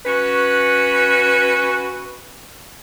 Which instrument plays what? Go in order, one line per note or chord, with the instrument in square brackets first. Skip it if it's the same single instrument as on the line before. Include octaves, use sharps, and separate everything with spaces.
[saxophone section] C#4 F#4 B4